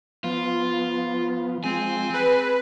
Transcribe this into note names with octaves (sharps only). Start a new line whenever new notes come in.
F3 B3 F4
F3 G#3 C4 G#5
G#4 B4